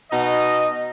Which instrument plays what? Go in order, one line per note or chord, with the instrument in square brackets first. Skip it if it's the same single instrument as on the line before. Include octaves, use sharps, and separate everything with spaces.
[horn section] B2 D#4 D#5